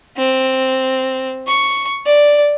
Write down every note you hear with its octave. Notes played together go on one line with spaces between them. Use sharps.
C4
C#6
D5